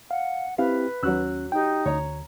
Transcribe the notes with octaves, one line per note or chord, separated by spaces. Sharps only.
F5 F#5
C4 E4 G4 B4 F5
D#2 F#3 C#4 F#4 E6 F#6
D#4 G4 G5
D2 C#5 A#5